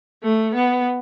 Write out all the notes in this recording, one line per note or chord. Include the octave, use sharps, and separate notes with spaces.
A3
B3